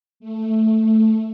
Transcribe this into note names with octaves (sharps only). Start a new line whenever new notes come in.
A3